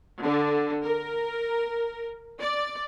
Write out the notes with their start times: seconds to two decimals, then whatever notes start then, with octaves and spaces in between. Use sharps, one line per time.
0.21 D3
0.83 A#4
2.39 D5